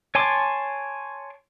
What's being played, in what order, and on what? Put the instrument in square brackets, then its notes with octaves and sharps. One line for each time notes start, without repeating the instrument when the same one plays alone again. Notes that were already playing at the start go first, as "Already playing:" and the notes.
[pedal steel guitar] C#5 G#5 A5 C6 D6